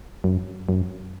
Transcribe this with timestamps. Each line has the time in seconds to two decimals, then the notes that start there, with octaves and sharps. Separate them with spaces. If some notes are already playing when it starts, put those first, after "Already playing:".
0.24 F#2
0.69 F#2